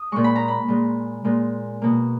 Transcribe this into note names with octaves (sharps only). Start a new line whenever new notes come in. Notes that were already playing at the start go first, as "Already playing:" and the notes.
Already playing: D#6
A#2 G#3 C#6
B5
A#5
B5
A#2 G#3
A#2 G#3
B2 A#3